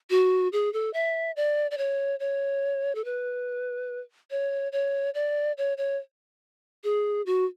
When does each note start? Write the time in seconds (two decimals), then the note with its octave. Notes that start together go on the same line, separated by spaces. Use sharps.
0.10 F#4
0.53 G#4
0.73 A4
0.94 E5
1.36 D5
1.71 D5
1.78 C#5
2.20 C#5
2.95 A4
3.05 B4
4.31 C#5
4.72 C#5
5.14 D5
5.58 C#5
5.78 C#5
6.84 G#4
7.26 F#4